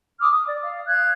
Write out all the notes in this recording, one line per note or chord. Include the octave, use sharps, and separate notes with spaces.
D6 D#6 F6
D#6
D5
F5
F5 F#6 G#6